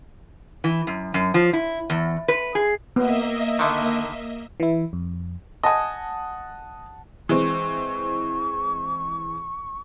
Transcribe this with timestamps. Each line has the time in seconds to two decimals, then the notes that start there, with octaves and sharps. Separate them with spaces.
0.64 E3
0.87 F#2
1.14 F#2
1.34 F3
1.53 E4
1.90 E2
2.28 B4
2.55 G#4
2.96 A#3 B3 D#5 E5
3.59 D3 D#3
4.60 E3 E4
4.93 F2
5.63 D#5 F#5 G#5 A5
7.29 E3 G#3 C4 C#6